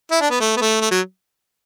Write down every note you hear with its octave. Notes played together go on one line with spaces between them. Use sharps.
E4
D4
B3
A3
B3
A3
A3
F#3